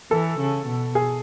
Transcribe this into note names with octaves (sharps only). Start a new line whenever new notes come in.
E3 A4
C#3
B2
G#4